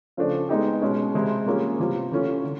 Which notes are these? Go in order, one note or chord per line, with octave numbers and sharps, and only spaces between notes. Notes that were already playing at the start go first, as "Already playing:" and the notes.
C#3 F3 A3 D4
G#3 B3 D#4 G4
B2 G#3 C#4
C3 E3 G#3 C4 E4
G3 A#3 C#4 F4 G#4
C3 E3 G3 C4 F4
E3 A3 C#4 F4
D3